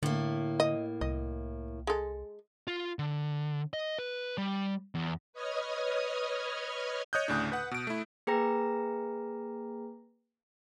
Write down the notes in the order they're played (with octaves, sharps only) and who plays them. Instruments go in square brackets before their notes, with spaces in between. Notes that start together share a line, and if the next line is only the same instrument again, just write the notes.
[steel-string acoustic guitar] A2 A#3 [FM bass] D3
[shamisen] D#5
[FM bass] C2 [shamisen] D#5
[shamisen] G#3 A4
[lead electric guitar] F4
D3
D#5
B4
G3
E2
[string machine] B4 C#5 D#5 D#6 F6 G#6
[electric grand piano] C#5 D#5 D#6 F#6 G6
D2 A2 C#3 D4
B4 F#5
B2 D7
A3 E4
[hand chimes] A#3 G#4 B4 G5 A#5 A#6